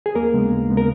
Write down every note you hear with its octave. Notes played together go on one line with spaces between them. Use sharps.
G#4
D#2 A#3 A#4
C#3 G#3 B3
D#2
C#3 G#3 B3
A#4